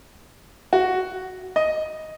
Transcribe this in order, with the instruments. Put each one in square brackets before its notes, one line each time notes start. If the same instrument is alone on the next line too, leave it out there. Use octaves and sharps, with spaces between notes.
[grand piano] F#4
D#5